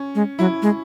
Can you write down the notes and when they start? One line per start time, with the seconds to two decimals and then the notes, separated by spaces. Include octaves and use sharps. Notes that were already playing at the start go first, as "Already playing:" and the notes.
Already playing: C#4
0.15 G#3
0.39 F#3 E4
0.62 G#3